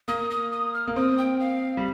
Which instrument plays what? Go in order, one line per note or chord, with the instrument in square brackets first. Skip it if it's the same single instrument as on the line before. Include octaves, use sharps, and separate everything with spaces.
[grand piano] A#3 [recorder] D#6
[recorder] D#6
D#6
F6
[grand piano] A#3
[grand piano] C4 [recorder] D#6
[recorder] G5
F5
[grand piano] G3